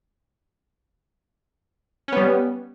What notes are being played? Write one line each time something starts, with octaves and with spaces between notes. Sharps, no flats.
G3 B3 C#4